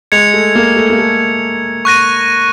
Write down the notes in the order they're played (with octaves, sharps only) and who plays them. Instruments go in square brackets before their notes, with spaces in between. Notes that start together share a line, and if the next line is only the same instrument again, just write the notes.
[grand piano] G#3 [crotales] G#6 C#7 F7
[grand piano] A3
A#3
A3
A#3
A3
[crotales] C#6 F#6 A#6 D#7